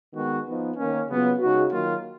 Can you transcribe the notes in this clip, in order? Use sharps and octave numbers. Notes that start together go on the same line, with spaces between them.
D#3 G#3 B3 F#4
F3 B3 D#4
D#3 A#3 C#4
C#3 F#3 B3 F4
C#3 G#3 D#4 F#4
D#3 F#3 A#3 F4